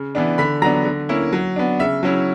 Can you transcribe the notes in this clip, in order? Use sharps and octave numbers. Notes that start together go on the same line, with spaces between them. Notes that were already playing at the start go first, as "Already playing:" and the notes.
Already playing: C#3
E3 B3 D4
D3 B5 B6
F#3 B3 D4 A#5 A#6
D3
A#3 C#4 E4
F#3
B3 D4
C#3 E5 E6
F#3 C#4 E4